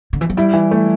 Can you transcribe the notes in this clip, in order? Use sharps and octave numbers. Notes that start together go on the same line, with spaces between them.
D3
E3
F#3
G3 E4
E3
A3